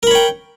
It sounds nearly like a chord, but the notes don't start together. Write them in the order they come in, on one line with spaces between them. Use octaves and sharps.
A#4 B5 C#5 G5